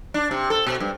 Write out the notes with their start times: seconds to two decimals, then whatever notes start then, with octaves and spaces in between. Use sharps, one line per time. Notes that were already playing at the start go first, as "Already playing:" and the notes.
0.14 D4
0.31 C3
0.50 A4
0.67 B2
0.80 G2